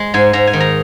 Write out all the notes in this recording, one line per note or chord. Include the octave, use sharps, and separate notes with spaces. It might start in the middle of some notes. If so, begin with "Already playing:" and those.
Already playing: G#3
G#2 G#5
G#2 A#5
G#5
D#3
A#5